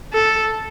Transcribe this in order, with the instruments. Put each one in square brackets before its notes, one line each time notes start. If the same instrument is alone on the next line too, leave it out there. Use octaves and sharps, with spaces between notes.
[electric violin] A4